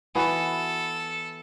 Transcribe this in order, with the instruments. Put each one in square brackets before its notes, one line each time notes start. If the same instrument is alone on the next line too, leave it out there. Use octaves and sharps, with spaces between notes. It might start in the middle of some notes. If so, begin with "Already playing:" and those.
[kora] E3 B3 F#4 [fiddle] A4